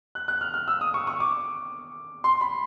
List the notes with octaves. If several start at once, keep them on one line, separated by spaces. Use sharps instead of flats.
F#6
F#6
F6
F6
E6
D#6
C#6
C#6
D6
C6
B5